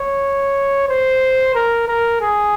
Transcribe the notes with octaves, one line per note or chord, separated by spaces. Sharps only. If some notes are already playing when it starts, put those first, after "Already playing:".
Already playing: C#5
C5
A#4
A#4
G#4